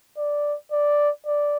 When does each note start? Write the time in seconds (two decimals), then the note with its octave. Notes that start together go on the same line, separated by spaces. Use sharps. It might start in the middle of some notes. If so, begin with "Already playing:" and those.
0.17 D5
0.72 D5
1.26 D5